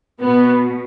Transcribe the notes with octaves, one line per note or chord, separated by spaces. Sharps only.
B2 B3